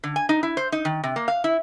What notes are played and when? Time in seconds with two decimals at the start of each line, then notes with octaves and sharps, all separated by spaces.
0.04 D3
0.16 G#5
0.29 D#4
0.43 E4
0.57 C5
0.72 D#4
0.85 D#3
1.04 C3
1.16 A#3
1.28 F5
1.44 E4